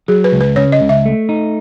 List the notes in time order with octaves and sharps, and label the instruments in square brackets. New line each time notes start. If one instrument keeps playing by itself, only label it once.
[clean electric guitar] F#3 [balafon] G#4
[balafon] B4
[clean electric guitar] C#2
[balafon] B4
[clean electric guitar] C#3 [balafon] C#5
[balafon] D#5
[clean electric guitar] C#2
[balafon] E5
[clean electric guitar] A3
D#4